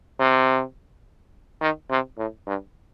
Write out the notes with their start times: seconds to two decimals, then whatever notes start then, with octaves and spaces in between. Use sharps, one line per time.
0.19 C3
1.61 D#3
1.90 C3
2.17 A2
2.47 G2